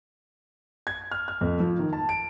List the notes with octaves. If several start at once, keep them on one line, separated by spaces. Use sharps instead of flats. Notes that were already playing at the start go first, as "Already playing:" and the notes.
G#6
F6
F6
F2
F3
D#3
A5
D7